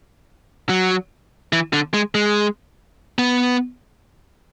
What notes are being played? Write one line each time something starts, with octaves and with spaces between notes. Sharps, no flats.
F#3
E3
D3
G#3
G#3
B3